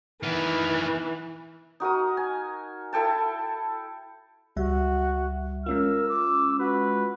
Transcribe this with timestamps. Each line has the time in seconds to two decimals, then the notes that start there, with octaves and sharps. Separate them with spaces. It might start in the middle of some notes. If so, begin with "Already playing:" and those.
0.23 D#3 E3 B3
1.80 D#4 F#4 A#4 D#6
2.17 G#5
2.93 E4 A4 G5 A5
4.56 C#2 G3 F#4 E5
5.66 G#3 C#4 F4 A#4 E6
6.09 D6
6.59 F#4 B4